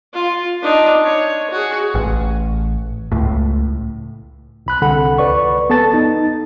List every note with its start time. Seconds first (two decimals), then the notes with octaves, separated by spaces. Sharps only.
0.13 F4
0.63 D4 D#4
1.05 C#5
1.51 F#4 G#4
1.95 A1
3.12 C#2 A2
4.66 C2 B5 F#6
4.82 C2 D3 A4 F#5 B5
5.18 C#2 B4 D5 C#6
5.70 B3 A4 A5 A6
5.94 D#4